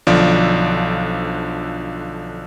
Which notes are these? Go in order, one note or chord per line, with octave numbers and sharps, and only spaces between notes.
B1 D3 F3 D5